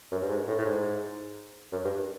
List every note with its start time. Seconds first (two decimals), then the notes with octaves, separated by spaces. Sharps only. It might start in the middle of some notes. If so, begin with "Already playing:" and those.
0.12 F#2
0.22 G2
0.30 G#2
0.47 A2
0.58 A2
0.65 G#2
1.72 F#2
1.84 G2